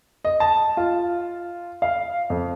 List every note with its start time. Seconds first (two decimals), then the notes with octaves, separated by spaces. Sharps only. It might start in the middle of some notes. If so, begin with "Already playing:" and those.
0.25 D#5
0.40 A5
0.77 F4
1.82 F5
2.30 F2